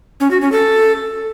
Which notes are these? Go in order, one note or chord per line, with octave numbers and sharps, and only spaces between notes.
C#4
F#4
C#4
A4